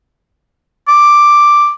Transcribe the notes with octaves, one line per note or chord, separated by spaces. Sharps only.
D6